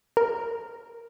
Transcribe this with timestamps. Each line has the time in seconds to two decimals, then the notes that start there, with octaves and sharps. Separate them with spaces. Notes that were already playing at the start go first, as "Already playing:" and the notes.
0.17 A#4